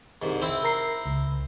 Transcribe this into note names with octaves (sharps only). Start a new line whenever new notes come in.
C2 G#2
C4 E4
A#4 A#5 C7
C#2